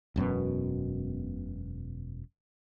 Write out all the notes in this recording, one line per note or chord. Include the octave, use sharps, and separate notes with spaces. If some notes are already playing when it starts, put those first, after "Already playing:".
E1 F#2 B2 B3